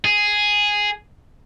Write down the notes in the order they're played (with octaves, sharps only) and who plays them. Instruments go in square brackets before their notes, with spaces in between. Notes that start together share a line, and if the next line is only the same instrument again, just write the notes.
[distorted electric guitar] G#4